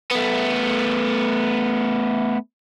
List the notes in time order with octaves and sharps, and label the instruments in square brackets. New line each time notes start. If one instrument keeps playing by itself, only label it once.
[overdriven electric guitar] A3 B3